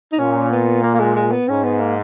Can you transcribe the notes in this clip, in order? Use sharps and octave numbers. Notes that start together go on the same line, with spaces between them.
D#4
A#2 C#4
B3
A#3
A#3
G#3
G#3
B3
G#2 C#4
B3
A#3